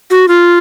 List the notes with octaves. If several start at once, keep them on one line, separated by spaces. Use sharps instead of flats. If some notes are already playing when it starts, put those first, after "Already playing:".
F#4
F4